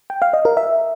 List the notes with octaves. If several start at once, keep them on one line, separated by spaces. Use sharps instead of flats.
G5
F5
D#5
A#4
E5